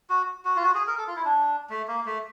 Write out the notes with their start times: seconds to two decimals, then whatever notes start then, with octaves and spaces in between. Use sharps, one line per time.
0.10 F#4
0.45 F#4
0.56 F4
0.63 F#4
0.75 G#4
0.87 A#4
0.98 A4
1.07 F4
1.16 E4
1.25 D4
1.70 A3
1.88 A#3
2.06 A3